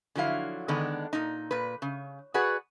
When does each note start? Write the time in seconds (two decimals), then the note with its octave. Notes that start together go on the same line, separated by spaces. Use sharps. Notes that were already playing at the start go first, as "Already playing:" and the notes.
0.15 D3 F3 F#3 E4 F5
0.68 D3 D#3 G#3 B3 D4
1.13 A#2 D#4
1.51 A#2 B4
1.82 C#3
2.34 F#4 G#4 B4 D5 F#5